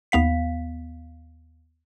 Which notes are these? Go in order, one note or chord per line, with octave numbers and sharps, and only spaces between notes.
D#2 B3 F5 B6